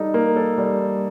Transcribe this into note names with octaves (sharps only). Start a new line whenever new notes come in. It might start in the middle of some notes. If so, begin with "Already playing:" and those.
Already playing: G3 D#4 A4
A#3
A4
G3